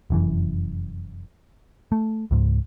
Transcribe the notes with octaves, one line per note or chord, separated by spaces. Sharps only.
F1 F#2 E3
A3
C#2 G#2